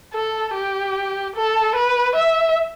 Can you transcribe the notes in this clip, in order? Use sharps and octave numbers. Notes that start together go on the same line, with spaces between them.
A4
G4
A4
B4
E5